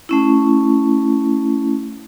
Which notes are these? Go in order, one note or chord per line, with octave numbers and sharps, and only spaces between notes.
A3 C#4 E4